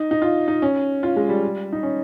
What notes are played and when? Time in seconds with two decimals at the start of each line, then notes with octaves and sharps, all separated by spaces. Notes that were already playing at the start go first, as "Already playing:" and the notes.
Already playing: D#4
0.11 D#4
0.22 F4
0.48 D#4
0.62 C#4
1.03 F4
1.17 G#3
1.29 G3
1.73 D#4
1.83 C#4